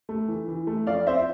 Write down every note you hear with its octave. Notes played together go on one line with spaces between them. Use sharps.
A3
E3
E3
A3
F2 D5 F5
C4 C5 E5